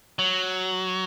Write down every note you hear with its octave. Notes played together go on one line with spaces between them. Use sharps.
F#3